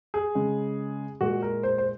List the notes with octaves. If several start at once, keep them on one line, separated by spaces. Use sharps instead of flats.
G#4
C#3 G#3
A#2 G#3 F#4
A#4
C5
C5